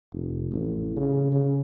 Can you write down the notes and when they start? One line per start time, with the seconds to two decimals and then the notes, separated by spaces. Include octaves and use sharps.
0.13 F1
0.51 A1
0.96 C#3
1.32 C#3